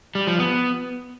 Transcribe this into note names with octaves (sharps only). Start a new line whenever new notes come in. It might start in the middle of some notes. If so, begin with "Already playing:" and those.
G3
F3
B3